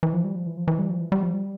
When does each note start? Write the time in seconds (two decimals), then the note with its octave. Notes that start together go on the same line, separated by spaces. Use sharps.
0.03 E3
0.13 F3
0.24 G3
0.36 F3
0.46 E3
0.57 F3
0.68 E3
0.79 G3
0.90 F3
1.00 E3
1.12 G3
1.23 F3
1.34 G3